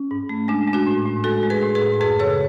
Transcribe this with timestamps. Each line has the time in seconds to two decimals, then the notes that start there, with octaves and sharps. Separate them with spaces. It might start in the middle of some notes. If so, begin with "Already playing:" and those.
Already playing: C#4
0.11 G#2
0.29 A3
0.48 G#3 D4
0.68 G#3
0.73 D4 F#4
0.87 A2
1.06 A2
1.24 G#3 F#4 A4
1.43 G#3
1.50 G#4 B4
1.62 A2
1.75 G#4 B4
1.82 A2
2.00 F#2 G#4 B4
2.19 C#3 A4 C#5